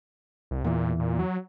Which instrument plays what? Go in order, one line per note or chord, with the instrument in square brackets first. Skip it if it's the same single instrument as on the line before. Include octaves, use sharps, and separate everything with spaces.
[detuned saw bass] C2
[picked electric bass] E2 E3 [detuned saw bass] A#2
[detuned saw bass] A#2
F#3